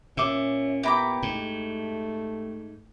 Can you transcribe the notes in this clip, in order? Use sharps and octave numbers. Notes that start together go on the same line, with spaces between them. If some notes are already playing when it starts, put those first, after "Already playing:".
A#2 C#4 E5 D6
B3 E4 G4 A#5 B5 D6
G#2 A3